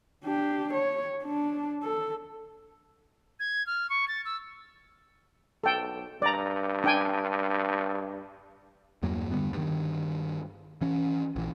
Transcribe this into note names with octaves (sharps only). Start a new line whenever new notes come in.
D4 G4
C#5
D4
A4
G#6
F6
C#6
A6
E6
B1 A4 G5
G2 D5 A#5
D4 G5 G#5
E2 G2 F#3 A#3
D3 F#3 G3 B3
G2 D#3
E3 C#4
A#1 E3